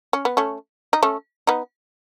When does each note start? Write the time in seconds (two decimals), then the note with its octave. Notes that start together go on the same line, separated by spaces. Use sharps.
0.13 C#4
0.25 B3
0.37 A3 C#4
0.93 D#4
1.03 A3 C#4
1.47 B3 D#4